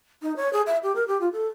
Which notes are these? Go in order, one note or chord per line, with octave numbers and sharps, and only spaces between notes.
D#4
C#5
G#4
E5
G4
A#4
G4
F4
A4